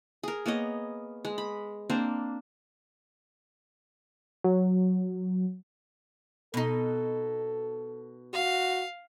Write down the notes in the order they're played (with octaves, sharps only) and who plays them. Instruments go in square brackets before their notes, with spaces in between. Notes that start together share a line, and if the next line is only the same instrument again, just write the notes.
[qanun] G#4 A#4
A#3 B3 C#5 D#5
G#3
B5
A#3 C4 D4 C5
[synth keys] F#3
[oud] B2 D#4 [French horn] A4
[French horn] F#4 [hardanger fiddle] F5